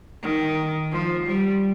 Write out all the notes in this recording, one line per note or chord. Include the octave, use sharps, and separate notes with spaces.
D#3
F3
G3